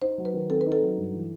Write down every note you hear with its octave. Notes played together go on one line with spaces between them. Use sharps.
D#4 C5
F#3
B4
D#3
C4 A4
B4
D#4
A4
F#3
G2
E3